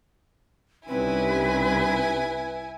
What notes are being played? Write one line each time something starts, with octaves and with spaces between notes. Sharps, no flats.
C2 G3 C4 C#4 D#4 E4 B4 G#5